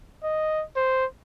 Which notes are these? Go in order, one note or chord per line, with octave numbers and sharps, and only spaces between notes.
D#5
C5